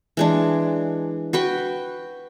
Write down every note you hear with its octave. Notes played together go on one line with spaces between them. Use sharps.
E3 G#3 D4
F#4 B4 G5